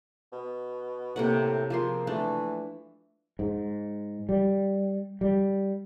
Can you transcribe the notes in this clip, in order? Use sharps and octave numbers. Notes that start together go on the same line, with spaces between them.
B2
A2 C3 A#3 F#5
F3 A#3 G#4 C6
E3 A3 D4
G#2
G3
G3